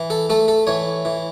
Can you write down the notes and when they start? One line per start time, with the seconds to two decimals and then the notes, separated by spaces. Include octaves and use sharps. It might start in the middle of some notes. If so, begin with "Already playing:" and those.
Already playing: E3
0.10 A4
0.30 A3 A4
0.48 A4
0.67 E3 C#5
1.05 E3